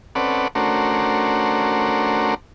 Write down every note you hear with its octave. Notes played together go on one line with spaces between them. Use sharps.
C4 C#4 A4 B4 D5 F#5
A3 C#4 D4 F#4 A#4 C5